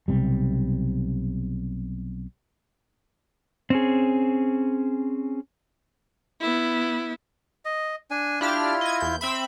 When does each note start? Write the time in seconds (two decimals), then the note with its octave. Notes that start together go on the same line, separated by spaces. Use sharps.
0.08 B1 C3 G3
3.70 C4 C#4 G#4
6.41 B3 E4
7.65 D#5
8.11 D4 G#5
8.41 D4 E4 F4 G4 F6
8.81 D#5 G#6
9.00 E2 G6
9.21 C4 E5 B5